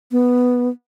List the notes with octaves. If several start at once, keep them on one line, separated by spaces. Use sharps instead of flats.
B3